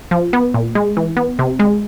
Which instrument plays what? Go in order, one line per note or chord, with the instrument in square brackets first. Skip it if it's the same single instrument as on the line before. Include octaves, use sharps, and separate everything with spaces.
[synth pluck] F3
B3
A#2
G#3
E3
B3
C3
G#3